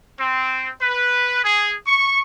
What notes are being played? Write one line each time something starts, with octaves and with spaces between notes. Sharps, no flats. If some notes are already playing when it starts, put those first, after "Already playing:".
C4
B4
G#4
C#6